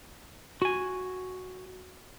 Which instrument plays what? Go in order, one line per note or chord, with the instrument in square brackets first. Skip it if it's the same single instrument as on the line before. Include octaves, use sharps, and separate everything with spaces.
[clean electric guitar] F#4 G#5